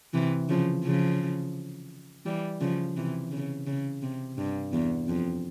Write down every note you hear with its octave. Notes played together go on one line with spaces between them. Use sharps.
C3 E3
C#3 F3
C#3 F3
E3 G3
C#3 F3
C3 E3
C#3
C#3
C3
G2
E2
F2